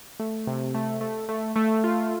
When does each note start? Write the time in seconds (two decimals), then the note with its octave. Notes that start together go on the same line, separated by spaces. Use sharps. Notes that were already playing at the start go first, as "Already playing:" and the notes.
0.19 A3
0.47 C3
0.74 A3
1.01 A3
1.29 A3
1.56 A3
1.84 F4